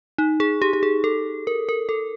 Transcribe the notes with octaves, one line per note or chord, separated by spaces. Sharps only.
D#4
G#4
G4
G4
G#4
A4
A#4
A#4
A4